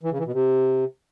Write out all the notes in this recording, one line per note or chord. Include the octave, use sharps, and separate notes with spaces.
E3
C#3
E3
B2
C3